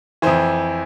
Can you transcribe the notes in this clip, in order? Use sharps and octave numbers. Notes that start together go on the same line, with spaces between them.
F2 E3 C5